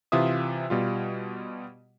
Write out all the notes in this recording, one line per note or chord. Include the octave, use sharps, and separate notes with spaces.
C3 E3 F4 E5 D#6
B2 G3 F4